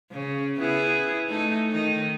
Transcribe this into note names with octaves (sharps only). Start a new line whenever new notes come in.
C#3
B3 E4 G#4
A3 D#4 A4
D#3 D#4